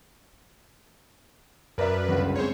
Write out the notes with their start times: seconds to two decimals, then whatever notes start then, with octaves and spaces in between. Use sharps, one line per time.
1.78 F#2 A#4 B4 D5 E5
2.09 G1 C#2 F#3
2.35 G#3 C4 G#4 C5 C#5